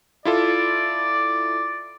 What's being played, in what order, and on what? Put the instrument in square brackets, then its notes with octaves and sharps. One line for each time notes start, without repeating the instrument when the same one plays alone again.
[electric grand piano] E4 F4 A4 [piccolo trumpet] D5